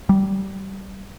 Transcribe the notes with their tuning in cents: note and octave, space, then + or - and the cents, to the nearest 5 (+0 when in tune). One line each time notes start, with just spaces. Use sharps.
G3 -20